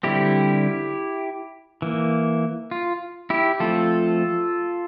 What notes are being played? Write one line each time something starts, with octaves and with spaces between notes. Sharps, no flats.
D3 G3 C4 E4 G4
E3 A#3
F4
E4 G4
F3 A3 C4 F4 A4